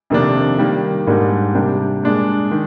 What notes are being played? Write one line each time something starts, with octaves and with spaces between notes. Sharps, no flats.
F2 C3 D#3 A#3 D4
D#3 G3 A#3
G#2 G3 A#3 D4
C3 G3 A#3 D4
A#2 G#3 D4
D#3